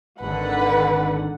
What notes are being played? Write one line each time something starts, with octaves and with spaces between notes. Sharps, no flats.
G#1 D3 D#3 B4 F#5